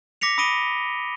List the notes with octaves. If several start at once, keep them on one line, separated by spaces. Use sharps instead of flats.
D6 A#6 B6 C#7 F7
B5 D#6 A#6 D7 D#7 G7